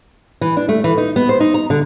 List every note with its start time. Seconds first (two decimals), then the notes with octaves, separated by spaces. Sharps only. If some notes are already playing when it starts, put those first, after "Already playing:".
0.41 E3
0.57 D4
0.69 A3
0.84 E3
0.98 D#4
1.16 B3
1.29 C5
1.40 D#4
1.54 A#5
1.70 D3